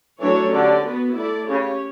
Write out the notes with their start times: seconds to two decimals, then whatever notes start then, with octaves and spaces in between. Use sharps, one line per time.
0.20 E3 F#3 A3 D4 A4 C#5
0.52 D3 C#4 G4 D5
0.84 B3 F#4 B4
1.16 A3 E4 A4 D5
1.48 C#3 C#4 G4 C#5